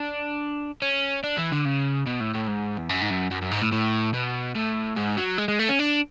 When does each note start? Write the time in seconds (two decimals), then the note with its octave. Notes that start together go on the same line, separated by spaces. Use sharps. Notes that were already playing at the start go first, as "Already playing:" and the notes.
Already playing: D4
0.82 C#4
1.23 D4
1.37 E3
1.51 D3
1.65 C#3
2.06 B2
2.20 A2
2.35 A2
2.48 G#2
2.78 E2
2.89 F#2
3.02 G#2
3.10 F#2
3.31 F#2
3.42 F#2
3.51 G#2
3.62 A2
3.72 A2
4.14 B2
4.56 A2
4.97 G#2
5.17 F#3
5.38 G#3
5.48 G#3
5.59 A3
5.69 C#4
5.79 D4